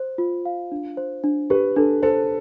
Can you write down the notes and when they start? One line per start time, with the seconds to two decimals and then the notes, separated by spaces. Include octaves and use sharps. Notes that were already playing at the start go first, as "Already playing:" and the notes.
Already playing: C5
0.18 F4
0.45 F5
0.72 D4
0.97 C5
1.24 D4
1.50 G4 B4
1.76 D4 A4
2.03 A4 C5